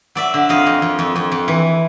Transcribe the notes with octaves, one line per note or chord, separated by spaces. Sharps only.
F#3 D5 E5
D3
F2 D#5 F5
F2
F2
F2
F2
F2
E3